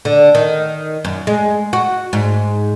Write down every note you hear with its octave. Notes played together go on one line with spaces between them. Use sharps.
D3
D#3
F#2
G#3
F#4
G#2